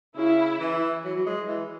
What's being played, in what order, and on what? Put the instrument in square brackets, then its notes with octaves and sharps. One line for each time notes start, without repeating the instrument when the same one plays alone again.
[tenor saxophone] C#3 [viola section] E4
[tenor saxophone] E3
F#3
F#3
G#3
E3